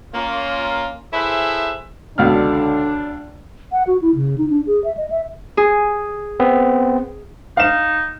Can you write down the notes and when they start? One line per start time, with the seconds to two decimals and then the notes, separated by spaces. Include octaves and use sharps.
0.14 A#3 C#4 F4
1.14 E4 G#4 A4 B4 C5 E5
2.18 C#2 B2 D3 D4 F6
3.72 F#5
3.87 F#4
4.02 E4
4.15 C#3
4.38 D#4
4.50 D4
4.67 G#4
4.84 E5
4.97 D#5
5.10 E5
5.57 G#4
6.40 B3 C4
7.57 D#4 F5 E7